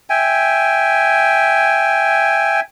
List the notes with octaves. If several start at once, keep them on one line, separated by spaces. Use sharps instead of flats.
E5 G5 G#5